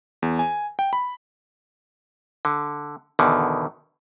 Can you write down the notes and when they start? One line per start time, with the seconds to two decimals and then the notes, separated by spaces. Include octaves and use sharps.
0.22 E2
0.39 G#5
0.79 G5
0.93 B5
2.45 D3
3.19 E2 B2 D3 D#3